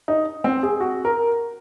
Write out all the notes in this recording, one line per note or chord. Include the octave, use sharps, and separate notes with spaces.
D#4
C4
G#4
F#4
A#4